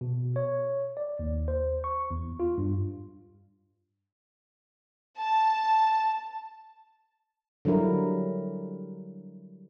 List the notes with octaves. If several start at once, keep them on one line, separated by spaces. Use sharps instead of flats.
B2
C#5
D5
D#2
C5
C#6
E2
F4
G2
A5
D3 F#3 G3 E4 A#4